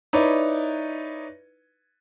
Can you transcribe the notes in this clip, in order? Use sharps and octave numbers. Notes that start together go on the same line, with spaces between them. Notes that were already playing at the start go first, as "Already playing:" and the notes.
D#4 E4 B4 C#5 D5